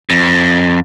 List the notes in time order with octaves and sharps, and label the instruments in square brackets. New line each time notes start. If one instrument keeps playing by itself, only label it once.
[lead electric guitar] F2